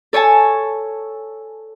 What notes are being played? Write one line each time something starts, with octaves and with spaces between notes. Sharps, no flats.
A4 C#5 G#5 A5